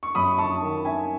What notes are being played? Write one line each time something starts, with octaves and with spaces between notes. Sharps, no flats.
C#6
F#2 B5 D#6
A5 C#6
D#3
E5 G#5